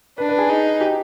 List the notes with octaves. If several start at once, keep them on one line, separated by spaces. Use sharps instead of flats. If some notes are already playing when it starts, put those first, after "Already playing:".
D4 B4
B4
G#4
D#4
G4